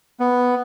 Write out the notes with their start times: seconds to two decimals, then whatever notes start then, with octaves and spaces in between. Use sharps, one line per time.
0.20 B3